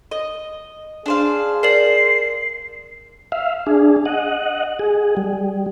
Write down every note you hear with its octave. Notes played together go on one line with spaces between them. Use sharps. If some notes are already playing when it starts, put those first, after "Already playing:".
D#5
D4 G#4 C5 F5
A#4 C5 D5 C7 F#7
E5 F5
D4 G#4
D#5 F#5
G#4
G3